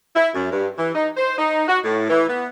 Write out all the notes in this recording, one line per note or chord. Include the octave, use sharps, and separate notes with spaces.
E4
F#2
G2
E3
D#4
C5
D#4
F#4
A2
E3
B3